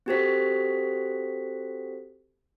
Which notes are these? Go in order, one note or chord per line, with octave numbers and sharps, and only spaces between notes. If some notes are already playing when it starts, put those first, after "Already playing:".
C4 F#4 G4 A4 C5 B6